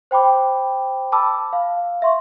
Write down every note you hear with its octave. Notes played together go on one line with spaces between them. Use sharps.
C5 G5 B5 D6
A5 B5 D6 E6
F5
E5 C6 C#6